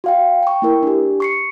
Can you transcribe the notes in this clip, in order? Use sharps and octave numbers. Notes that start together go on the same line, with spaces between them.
F#4 F5 G5
G5 C#6
A#3 E4 A#4
D4 G4
C#6 C7 C#7